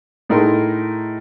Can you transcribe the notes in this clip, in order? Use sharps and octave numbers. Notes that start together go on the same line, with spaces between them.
A2 D#4 G#4 A#4 C6